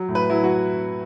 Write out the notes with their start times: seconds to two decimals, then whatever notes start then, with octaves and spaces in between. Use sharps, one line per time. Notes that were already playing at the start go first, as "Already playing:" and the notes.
Already playing: F#3
0.08 A2
0.15 B4
0.30 F#3 E4
0.44 F#4